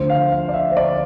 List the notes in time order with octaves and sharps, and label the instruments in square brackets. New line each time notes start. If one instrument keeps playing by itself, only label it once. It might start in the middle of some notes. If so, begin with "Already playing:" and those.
Already playing: [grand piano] D2 D3 F3 C5
F5
F5
D5
E5
C5
D5